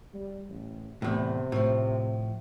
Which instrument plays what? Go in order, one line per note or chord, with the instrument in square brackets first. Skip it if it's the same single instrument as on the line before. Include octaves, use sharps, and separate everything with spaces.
[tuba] G3
A1
[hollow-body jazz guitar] E2 A2 [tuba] C3
[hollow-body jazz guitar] A2 F3